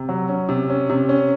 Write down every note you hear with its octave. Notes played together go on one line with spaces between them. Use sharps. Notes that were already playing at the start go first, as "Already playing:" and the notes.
Already playing: C3
F#3
C#4
C3
C#4
C3
C#4